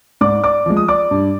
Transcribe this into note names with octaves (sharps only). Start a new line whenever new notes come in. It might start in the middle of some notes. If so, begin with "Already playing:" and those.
G#2 D5 D6
D5 D6
F3 G#3
D#6
D5 D6
G2